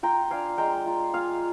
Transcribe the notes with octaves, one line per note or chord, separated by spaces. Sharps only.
F4 G5 A#5
D4 F5 G#5
G#3 G5 A#5
F4
F4 F5 G#5